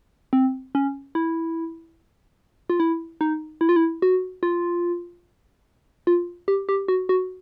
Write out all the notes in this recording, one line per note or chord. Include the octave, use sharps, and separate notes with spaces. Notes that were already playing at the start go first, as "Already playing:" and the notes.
C4
C#4
E4
F4
E4
D#4
E4
F4
E4
F#4
F4
F4
G4
G4
F#4
F#4